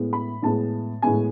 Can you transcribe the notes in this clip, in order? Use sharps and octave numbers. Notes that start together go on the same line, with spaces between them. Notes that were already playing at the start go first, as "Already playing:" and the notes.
Already playing: A2 G#3 B3
B5
A2 G#3 B3 A5
A2 G#3 B3 G#5